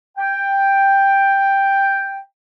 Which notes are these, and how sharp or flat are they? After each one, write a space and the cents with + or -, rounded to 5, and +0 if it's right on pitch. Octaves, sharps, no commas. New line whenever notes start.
G5 +5